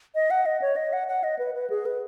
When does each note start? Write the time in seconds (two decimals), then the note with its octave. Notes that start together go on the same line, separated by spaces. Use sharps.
0.15 D#5
0.31 F#5
0.46 D#5
0.61 C#5
0.76 D#5
0.93 F#5
1.08 F#5
1.24 D#5
1.39 B4
1.55 B4
1.70 G#4
1.86 B4